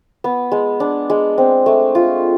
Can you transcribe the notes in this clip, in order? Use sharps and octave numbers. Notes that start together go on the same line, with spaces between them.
B3
G#3
D4
G#3
C4
A3
F4